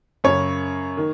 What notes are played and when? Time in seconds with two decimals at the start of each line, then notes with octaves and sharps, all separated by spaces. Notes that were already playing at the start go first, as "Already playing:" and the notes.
0.24 F#2 C#3 C#5
0.97 D#3